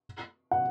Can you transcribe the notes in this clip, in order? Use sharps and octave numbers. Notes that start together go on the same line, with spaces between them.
F#5